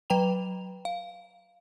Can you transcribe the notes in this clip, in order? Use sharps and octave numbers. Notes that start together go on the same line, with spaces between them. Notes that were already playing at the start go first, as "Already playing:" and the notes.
F#3 B4 G5 A#5 F7
F5